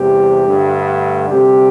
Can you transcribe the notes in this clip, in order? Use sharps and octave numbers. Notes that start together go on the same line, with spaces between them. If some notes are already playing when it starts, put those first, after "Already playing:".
Already playing: E2 C3 G3 C4 G4
G2 D3 A3
D2 C3 G3 G4